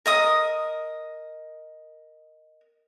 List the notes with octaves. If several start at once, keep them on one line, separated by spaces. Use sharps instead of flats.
A#4 D#5 D#6